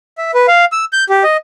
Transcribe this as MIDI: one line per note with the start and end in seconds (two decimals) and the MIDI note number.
0.18 0.31 76
0.34 0.46 71
0.48 0.65 77
0.72 0.85 88
0.93 1.04 91
1.09 1.23 67
1.23 1.37 75